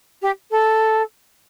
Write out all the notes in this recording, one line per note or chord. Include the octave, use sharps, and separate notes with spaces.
G4
A4